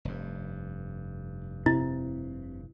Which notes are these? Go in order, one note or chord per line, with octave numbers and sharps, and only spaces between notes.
F1 G2
C3 E4